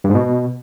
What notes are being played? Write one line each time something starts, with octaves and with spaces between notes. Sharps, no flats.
G2
G#2
B2